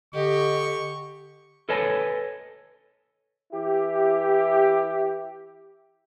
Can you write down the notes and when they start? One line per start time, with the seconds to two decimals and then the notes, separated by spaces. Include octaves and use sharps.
0.15 D3 G4 D#5 C#6
1.69 A4 B4 C#5 D#5 G#5 A5
3.52 E3 E4 G4